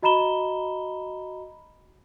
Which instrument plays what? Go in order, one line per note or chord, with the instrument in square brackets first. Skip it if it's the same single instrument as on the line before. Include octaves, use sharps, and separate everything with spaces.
[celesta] F#4 D#5 A#5 B5 E7 G7